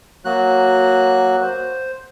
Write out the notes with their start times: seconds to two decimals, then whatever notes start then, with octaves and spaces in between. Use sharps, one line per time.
0.25 F#3 A#3 F#4 F#6
1.43 C5